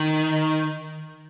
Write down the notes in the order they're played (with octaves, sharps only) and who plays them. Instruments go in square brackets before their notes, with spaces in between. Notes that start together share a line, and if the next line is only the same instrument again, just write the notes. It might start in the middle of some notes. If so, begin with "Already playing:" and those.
Already playing: [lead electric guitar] D#3